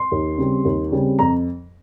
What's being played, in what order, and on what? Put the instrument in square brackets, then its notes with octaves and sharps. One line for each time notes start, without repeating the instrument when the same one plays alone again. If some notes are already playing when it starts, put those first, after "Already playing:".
Already playing: [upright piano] C6
D#2
C#3 G3 C4
D#2
C#3 G3 C4
F2 A#5